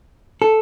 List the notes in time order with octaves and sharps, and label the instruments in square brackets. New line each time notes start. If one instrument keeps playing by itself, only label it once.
[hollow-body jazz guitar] A4